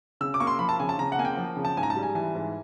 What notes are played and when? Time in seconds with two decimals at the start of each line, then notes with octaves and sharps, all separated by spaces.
0.21 C#3 E6
0.34 D6
0.40 A#3 C#6
0.47 C6
0.59 F3 B5
0.69 A5
0.79 C#3 G#5
0.89 A5
0.99 C#3 A#5
1.12 F#5
1.18 A#3 G#5
1.25 G5
1.37 F3
1.56 C#3
1.65 A5
1.77 G#2 G#5
1.83 A#5
1.90 A5
1.96 G3
2.03 G#5
2.15 E3 G#5
2.35 G#2